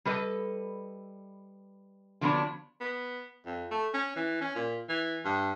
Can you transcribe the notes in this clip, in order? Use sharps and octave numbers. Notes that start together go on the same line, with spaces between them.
G3 A4 B4 D#5
D3 F3 F#3 A#3 B3 D4
B3
F2
A3
C#4
E3
C#4
A#2
E3
G2